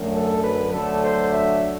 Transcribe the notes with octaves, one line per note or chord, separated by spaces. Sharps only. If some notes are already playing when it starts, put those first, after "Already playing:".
Already playing: F#2 D3 F#3 A3
A4
B4
D2 D3 F#3 A3 A4
C5
E5